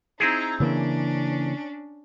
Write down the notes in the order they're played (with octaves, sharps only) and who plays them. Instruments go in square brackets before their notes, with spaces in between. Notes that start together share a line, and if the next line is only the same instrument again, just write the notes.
[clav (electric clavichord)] C4 E4 G#4 [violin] D#4 A#5
[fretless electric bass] C#3 E3 A#3 [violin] C#4 D4